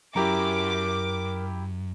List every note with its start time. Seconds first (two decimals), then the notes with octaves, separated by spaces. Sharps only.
0.16 F#2 E4 G4 A#4 A#5 D6